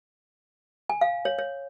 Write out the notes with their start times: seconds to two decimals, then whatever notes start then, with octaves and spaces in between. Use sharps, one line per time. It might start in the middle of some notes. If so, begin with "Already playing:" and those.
0.89 G#5
1.01 F5
1.25 C#5
1.39 C#5